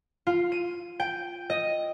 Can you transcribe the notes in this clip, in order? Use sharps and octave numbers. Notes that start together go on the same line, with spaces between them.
F4
D#7
G5
D#5